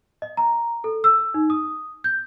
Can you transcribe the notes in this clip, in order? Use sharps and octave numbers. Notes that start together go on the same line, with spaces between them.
D#5
A#5
A4
E6
D#4
D#6
G6